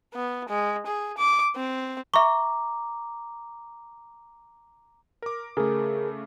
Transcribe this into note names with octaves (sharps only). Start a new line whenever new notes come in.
B3
G#3
G#4
D6
C4
E5 A#5 C#6 D6
A#4 D6
C#3 A3 G#4 A#4